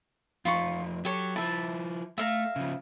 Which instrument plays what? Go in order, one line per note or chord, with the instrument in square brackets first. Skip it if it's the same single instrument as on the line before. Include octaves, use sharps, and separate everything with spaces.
[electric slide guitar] F2 F3 D#4 [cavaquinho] F4 B5 C#6
[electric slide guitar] F#3 [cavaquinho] G4 A4 C#5
[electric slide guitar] F3 E4 [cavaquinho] E5 A5
[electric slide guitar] A3 [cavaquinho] E5 F5 A#5
[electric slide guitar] C#3 F3